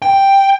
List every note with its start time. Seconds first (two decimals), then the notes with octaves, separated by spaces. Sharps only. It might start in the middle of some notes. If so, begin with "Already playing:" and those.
0.02 G5